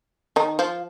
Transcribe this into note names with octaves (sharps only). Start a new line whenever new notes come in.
D#3 D#4
F3 F4